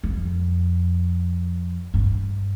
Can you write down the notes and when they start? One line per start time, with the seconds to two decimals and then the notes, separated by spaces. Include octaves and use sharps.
0.04 F2
1.94 G2